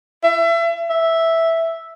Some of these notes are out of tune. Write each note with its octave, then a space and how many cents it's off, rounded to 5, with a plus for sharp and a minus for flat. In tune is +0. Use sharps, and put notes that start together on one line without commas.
E5 +30
E5 -5